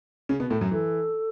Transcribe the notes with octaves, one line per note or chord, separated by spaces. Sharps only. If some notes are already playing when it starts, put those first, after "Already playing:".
C#3 C#4
B2 B3
A2 A3
F#2 F#3
E3 A4